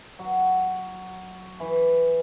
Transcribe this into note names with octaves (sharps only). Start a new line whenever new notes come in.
F#3
E3